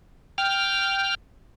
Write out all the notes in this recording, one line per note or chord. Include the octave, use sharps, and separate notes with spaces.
G5 F6